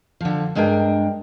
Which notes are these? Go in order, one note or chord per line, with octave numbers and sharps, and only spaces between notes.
D3 F3
G2 G#3 D4 A#4 G5